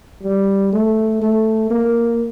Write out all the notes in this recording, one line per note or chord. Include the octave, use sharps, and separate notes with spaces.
G3
A3
A3
A#3